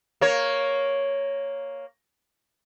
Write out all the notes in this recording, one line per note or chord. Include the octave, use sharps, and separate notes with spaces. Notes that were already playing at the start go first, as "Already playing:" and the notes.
A#3 C#5